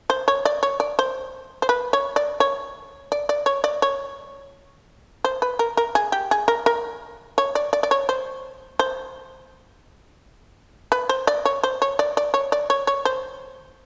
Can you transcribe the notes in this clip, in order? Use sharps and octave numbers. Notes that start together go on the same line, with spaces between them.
C5
C#5
D5
C#5
D5
C5
C5
B4
C#5
D5
C#5
D5
D5
C#5
D5
C#5
C5
B4
A#4
A#4
G#4
G4
G#4
A#4
A#4
C#5
D5
D5
D5
C#5
C5
C5
B4
C5
D5
C#5
C5
C#5
D5
D5
C#5
D5
C#5
C#5
C5